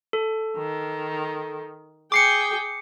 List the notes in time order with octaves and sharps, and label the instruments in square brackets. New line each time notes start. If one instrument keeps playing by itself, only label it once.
[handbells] A4
[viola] D#3
[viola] G#4 G5 [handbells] D6 C7 C#7